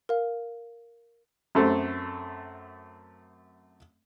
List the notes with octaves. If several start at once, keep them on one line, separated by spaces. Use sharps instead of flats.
A#4 F5
F#2 A3 C4